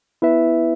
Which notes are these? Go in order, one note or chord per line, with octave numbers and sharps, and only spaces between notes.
B3 E4 B4 E5